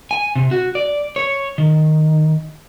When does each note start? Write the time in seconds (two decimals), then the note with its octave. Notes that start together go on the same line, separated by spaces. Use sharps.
0.11 G#5
0.36 C3
0.51 F#4
0.75 D5
1.16 C#5
1.58 D#3